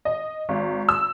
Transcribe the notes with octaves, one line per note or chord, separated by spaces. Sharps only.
D#5
G#1
E6